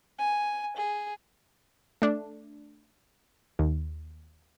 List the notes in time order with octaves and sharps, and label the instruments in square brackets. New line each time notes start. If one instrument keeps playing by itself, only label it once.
[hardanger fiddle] G#5
G#4
[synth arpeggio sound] A3 D4
D#2